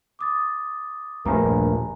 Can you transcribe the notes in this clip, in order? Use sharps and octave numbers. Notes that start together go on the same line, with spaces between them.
D6 D#6 A6
D#1 A#1 G2 A3 A#3 A#4 G#5 A#5